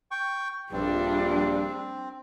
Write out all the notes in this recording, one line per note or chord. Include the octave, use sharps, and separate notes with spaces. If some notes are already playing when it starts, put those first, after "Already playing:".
G5 C#6
A#1 G2 G3 C4 D4